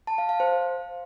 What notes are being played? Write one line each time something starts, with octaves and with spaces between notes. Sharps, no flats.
A5
F5
F5
C5